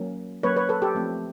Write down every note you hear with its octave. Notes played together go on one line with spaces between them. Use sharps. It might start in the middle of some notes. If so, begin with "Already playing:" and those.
Already playing: F#3 A#3 C#4
F#3 A#3 C#4 B4 C#5
B4 C#5
A4 B4
G4 A4
F3 A3 C4